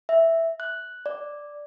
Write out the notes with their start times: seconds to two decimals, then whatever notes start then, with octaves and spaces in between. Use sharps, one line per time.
0.09 E5
0.60 F#6
1.06 D5